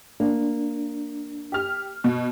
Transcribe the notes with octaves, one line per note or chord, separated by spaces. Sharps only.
A#3 D4
G4 F6
B2